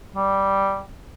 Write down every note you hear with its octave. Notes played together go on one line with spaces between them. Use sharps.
G3